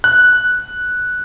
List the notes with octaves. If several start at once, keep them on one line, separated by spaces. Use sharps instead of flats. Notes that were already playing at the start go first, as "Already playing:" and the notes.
F#6